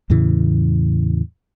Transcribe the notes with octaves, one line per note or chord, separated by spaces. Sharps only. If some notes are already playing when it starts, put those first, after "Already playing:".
E2 A2 C#3 E3